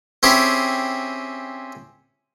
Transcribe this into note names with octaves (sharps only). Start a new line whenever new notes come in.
C4 C#4 E4 G4 G#4